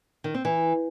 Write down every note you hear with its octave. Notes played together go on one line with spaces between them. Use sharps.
D#3
C4
E3